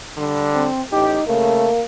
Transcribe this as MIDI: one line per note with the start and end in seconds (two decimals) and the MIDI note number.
0.16 0.67 50
0.16 0.67 55
0.16 0.67 62
0.55 0.82 60
0.92 1.18 33
0.92 1.22 63
0.92 1.18 67
1.27 1.68 49
1.27 1.68 57
1.27 1.84 58